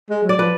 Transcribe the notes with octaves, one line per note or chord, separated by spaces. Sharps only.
G#3
F#3
D5
F3 B4